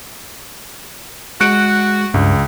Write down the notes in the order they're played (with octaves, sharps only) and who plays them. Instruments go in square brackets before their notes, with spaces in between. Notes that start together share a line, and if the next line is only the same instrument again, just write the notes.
[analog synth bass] G#3 [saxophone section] F#4 [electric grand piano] F#6 C#7 D7
[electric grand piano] C#2 [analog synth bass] G2